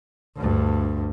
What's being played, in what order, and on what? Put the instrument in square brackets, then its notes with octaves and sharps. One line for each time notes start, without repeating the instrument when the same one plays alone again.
[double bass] D2 G2